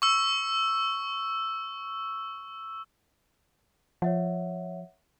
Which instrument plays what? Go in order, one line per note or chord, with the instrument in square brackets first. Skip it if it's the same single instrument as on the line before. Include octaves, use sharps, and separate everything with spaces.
[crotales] C#6 E6
[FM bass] F3 [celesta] C#5 E5 F#5